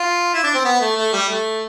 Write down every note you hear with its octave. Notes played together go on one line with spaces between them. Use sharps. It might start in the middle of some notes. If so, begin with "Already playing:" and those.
Already playing: F4
E4
D4
C4
B3
A3
A3
G3
A3